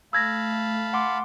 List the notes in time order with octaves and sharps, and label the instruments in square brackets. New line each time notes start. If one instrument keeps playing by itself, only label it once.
[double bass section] A3 [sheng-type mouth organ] F5 A5 B5 [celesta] E6 G#6 A#6
[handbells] F#5 C6 D6